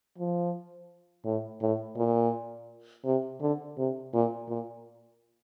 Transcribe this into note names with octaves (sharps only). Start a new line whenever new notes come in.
F3
A2
A2
A#2
C3
D3
C3
A#2
A#2